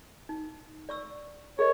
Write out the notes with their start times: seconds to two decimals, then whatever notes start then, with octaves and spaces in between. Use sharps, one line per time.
0.29 D#4
0.89 D5 C#6 E6
1.59 G#4 A#4 C#5 D#5